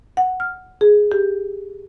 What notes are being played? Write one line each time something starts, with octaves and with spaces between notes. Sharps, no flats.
F#5
F6
G#4
G4